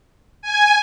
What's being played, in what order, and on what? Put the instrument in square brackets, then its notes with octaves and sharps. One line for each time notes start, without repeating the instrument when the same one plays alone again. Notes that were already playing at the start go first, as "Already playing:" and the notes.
[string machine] G#5